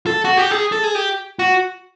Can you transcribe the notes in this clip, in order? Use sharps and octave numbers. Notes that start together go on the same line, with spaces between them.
A4
F#4
G4
G#4
A4
G#4
G4
F#4